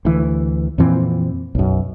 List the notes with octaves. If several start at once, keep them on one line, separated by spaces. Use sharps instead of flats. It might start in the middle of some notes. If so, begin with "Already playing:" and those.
D2 E3
F2 A#2 E3 C4
B1 F#2